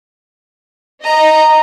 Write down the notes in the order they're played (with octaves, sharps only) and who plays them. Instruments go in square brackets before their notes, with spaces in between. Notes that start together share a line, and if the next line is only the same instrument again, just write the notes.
[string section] D#5 [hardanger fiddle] A#5